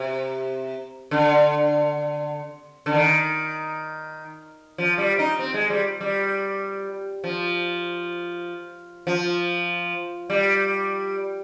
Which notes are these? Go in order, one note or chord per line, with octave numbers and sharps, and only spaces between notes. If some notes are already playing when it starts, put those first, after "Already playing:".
Already playing: C3
D3
D3
D#3
F3
G3
D#4
C4
G#3
G3
G3
F3
F3
G3